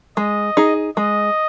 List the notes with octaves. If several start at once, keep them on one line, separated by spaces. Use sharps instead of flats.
G#3 D#5
D#4 G#4
G#3 D#5